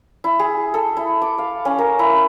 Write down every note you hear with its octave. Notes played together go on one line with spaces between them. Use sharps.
E4
G#4
A4
E4
D6
F5
C#4
A#4
E4